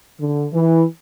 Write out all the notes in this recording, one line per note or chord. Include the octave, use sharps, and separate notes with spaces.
D3
E3